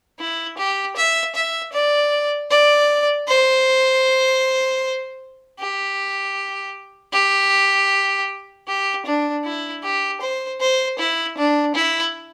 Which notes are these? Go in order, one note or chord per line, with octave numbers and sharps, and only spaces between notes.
E4
G4
E5
E5
D5
D5
C5
G4
G4
G4
D4
E4
G4
C5
C5
E4
D4
E4